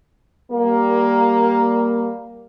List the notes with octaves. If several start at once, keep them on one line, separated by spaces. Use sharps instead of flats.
G3 A#3